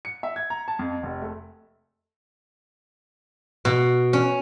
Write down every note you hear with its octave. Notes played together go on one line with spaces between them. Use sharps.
C#7
E5
G#6
A#5
A5
F2
F1
A3
B2
C#4